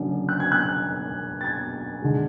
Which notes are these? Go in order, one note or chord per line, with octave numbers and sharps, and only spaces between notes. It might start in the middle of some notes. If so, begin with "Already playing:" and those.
Already playing: F#1 F#2 D3
F#6
G#6
F#6
A6
G#6
D3 G#3